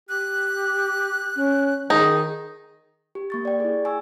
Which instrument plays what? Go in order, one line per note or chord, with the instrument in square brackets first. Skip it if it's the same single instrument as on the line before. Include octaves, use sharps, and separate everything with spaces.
[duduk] G4 [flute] F#6
[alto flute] C#4
[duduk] D#3 [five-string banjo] D#4 [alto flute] G#4
[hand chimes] G4
A#3 C#6 A6
D5 G5
E4 G#4
G#5 C#6 E6